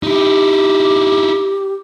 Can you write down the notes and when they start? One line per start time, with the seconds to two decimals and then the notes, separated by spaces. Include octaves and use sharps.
0.03 D#4 E4 G4